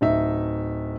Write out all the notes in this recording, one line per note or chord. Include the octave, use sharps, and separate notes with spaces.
D1 D#4 E5